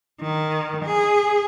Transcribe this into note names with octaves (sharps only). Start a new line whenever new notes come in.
D#3
G#4